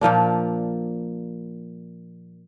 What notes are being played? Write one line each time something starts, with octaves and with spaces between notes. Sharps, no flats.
A#2 F3 A#3 D4